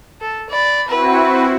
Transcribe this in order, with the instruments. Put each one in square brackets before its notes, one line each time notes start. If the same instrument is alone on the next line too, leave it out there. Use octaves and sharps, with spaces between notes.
[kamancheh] A4
D5 B5
[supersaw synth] C4 E4 F#4 [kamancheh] B4